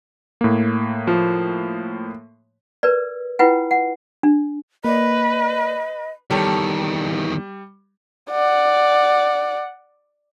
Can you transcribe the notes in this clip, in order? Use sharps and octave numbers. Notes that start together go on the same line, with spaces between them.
A2 A#3
F3
A#4 B4 D5
E4 F4 B4 F#5 G5
F#5
D4
A#3 B4 D5 D#5
E2 D#3 G3 G4 A4 C#5
D5 F#5